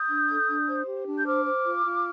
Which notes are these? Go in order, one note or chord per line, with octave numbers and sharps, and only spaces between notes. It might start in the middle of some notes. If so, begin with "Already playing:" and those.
Already playing: D#6 G6
D4
A4
D4
C5
G4
D4
G6
C5 D6 F6
C5
F4
F4